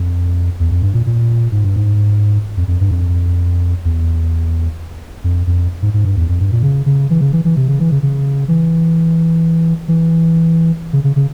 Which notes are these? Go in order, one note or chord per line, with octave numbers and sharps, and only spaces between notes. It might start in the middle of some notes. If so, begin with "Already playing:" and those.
Already playing: F2
E2
F2
G2
A#2
A#2
G#2
G2
G#2
F2
F2
G2
F2
E2
F2
F2
G#2
G#2
G2
E2
F2
G2
A#2
C#3
C#3
E3
C#3
E3
E3
C3
C#3
E3
C#3
C#3
E3
E3
C#3
C#3
C#3